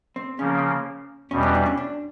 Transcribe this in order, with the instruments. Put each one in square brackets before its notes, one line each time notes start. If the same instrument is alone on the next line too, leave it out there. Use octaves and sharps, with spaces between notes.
[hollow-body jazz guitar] C4
[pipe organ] C#3 F3 A#3 [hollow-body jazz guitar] C#4
[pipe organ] E2 B2 G3 [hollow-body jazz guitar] C#4
[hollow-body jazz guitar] C#4
D4
C#4
D4